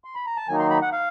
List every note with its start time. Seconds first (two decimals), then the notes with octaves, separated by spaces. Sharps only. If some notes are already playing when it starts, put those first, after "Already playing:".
0.04 C6
0.15 B5
0.26 A#5
0.37 A5
0.48 D#3 F#3 A#3 D#4 G#5
0.59 C6
0.70 B5
0.82 F#5
0.93 F5